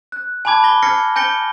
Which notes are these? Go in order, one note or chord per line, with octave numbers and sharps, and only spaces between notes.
F#6
G#5 A5 B5 D6 G#6
B5 A#6 G7
F6 G#6 A#6 C7 C#7
G#5 G6 A#6 C#7 G7